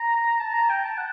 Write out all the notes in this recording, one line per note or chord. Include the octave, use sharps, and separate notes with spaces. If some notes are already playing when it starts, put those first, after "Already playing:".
Already playing: A#5
A5
A#5
G5
A5
F#5